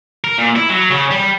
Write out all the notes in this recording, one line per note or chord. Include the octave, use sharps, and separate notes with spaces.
A#4
A#2
E4
F#3
C#3
G3